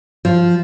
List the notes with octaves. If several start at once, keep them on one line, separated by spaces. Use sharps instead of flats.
F3